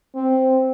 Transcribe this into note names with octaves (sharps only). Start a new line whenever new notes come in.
C4